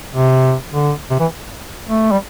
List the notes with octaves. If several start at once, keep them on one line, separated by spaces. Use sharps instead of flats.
C3
D3
C3
E3
A3
G3